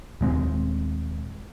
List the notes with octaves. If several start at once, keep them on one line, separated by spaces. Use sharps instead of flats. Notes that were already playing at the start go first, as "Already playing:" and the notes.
D#1 G#3 C4